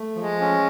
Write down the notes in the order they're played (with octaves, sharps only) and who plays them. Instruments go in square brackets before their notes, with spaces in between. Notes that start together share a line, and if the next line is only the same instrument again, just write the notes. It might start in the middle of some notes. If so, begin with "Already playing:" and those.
Already playing: [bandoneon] A3
[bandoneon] F3 [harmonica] G#3
[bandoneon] C#4